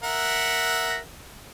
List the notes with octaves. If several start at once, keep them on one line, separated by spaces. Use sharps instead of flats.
A#4 E5 F#5